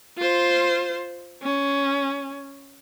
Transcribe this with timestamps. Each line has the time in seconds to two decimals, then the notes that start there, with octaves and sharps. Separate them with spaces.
0.18 F4 C5
1.43 C#4